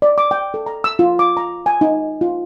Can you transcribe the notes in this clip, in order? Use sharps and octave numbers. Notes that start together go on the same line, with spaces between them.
D5
D6
G5
A4
A#5
E6
F4
D6
A#5
G#5
D#4
F4